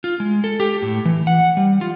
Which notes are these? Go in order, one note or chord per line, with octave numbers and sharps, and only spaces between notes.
F4
G#3
A4
G4
A2
E3
F#5
G3
F4